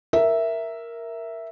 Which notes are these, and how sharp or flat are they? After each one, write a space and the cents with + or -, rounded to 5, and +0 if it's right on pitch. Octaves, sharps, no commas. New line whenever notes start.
A#4 +0 E5 +0